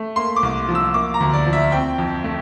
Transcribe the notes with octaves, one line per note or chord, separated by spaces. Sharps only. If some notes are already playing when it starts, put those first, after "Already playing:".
Already playing: A3
A#3 C6
D6
C2
F3
E6
A#3 D6
A#5
D2
D5
F3
E5
C4 G5
F2
A3